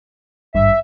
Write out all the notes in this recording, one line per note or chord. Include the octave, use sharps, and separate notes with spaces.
G#1 G2 E5